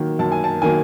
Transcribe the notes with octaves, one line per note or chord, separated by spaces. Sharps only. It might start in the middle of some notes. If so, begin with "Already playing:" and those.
Already playing: D#3 F#3 A#3
F#2 A5
G#5
A5
D#3 F#3 A#3 G#5